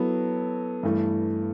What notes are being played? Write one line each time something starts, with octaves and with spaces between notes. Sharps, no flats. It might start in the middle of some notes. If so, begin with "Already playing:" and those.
Already playing: F#3 B3 E4 A4
G2 E3 A3